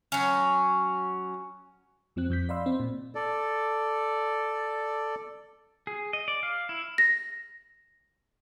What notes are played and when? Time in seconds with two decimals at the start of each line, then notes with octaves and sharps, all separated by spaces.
0.12 F#3 C#4
2.16 F2 F3 C4 F#6
2.30 F2 G6 B6
2.49 D5 D#5 F5 B5 C6 E6
2.66 C4
2.80 A#2
3.15 A4 D5
5.87 G#4
6.13 D#5
6.28 D5
6.43 F5
6.69 E4
6.98 A#6